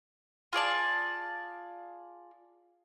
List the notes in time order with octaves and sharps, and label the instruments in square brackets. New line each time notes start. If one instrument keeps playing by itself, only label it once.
[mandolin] F4 G#4 D5 A5